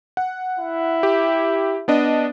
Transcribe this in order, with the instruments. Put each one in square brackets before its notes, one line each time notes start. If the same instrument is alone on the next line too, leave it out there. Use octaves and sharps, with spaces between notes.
[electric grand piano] F#5
[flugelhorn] E4
[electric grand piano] G4
B3 D4 D#5